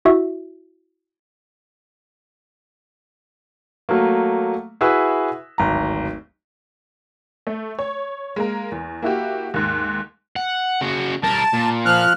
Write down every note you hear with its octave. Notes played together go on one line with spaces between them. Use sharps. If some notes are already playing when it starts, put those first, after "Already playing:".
E4 F#4 E5
F#3 A3 A#3
E4 F#4 G#4 B4 E5 E6
D1 G#1 A#5
A3
C#5
G#3 A#3 A#4
E2
A#3 E4 F#4 G4
D#2 G#2
F#5
C#3 F#4
G3 A#4 A5
A#2
F3 F6 F#6